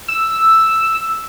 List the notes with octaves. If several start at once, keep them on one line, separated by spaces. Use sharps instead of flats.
E6